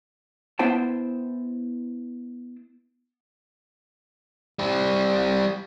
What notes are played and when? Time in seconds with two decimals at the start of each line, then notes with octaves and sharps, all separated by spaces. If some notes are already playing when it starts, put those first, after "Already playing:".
0.59 B3 E4 C5 G5 A5
4.59 G3 C4